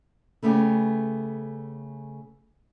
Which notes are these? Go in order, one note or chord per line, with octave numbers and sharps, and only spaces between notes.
C#3 A3 B3 C#4 G4